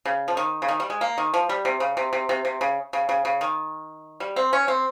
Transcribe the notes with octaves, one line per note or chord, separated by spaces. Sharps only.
C#3
F3
D#3
C#3
D#3
G3
G#3
A#3
D#3
F3
G3
C3
C#3
C3
C3
C3
C3
C#3
C#3
C#3
C#3
D#3
G3
C4
C#4
C4